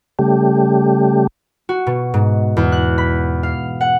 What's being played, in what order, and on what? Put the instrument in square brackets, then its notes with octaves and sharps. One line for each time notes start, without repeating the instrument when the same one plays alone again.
[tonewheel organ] C#3 G3 A3 G4
[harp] F#4
B2
G#2
E2
F#6
B5
F5
F#5